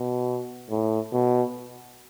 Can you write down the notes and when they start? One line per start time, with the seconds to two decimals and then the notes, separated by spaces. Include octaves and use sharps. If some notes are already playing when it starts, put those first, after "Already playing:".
Already playing: B2
0.70 A2
1.13 B2